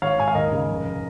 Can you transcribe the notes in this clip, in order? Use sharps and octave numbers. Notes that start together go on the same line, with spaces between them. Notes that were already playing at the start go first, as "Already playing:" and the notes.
G#1 C#5 F5
G#2 G#5
F5
D#2 A#4 D#5
C#3
F1